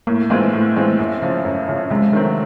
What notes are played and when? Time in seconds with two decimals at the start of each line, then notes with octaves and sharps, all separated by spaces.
0.07 A2 A#3
0.30 E3 G#3 A#3 C4 F4
0.53 A2 A3
0.66 A#3
0.76 E3 G#3 A3 C4 F4
0.99 F#2
1.22 C#3 F3
1.45 F#2
1.68 C#3 F3
1.90 C3 G#3
2.13 D#3 F#3 A3 C4